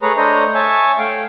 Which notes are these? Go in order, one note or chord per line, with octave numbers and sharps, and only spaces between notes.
A3 G#4 B4 C#5 A#5
A3 D4 C5 C#5 D#5 A#5
C#5 E5 G#5 A5
A3 F5 G5